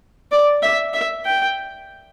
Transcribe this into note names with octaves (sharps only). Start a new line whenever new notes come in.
D5
E5
E5
G5